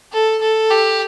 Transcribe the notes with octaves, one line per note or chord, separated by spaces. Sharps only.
A4
A4
G4